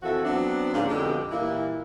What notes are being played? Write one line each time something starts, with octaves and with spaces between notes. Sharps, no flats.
F2 E3 F3 F#4 A4 E5
F#3 B3 C4 D4
G#2 C#3 F3 A#3 C#4 D4
F2 B2 D3 G#3 G4
A#2 E3 G3 A#3 E4